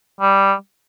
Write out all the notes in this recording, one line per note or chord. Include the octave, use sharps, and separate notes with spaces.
G3